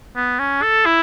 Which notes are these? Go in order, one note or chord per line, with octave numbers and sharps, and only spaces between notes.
B3
C#4
A4
E4